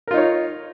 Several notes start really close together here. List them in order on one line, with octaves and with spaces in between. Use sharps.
A#4 F4 D#4 C#5